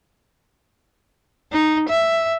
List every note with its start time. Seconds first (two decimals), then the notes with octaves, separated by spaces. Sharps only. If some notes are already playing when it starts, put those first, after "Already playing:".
1.52 D#4
1.89 E5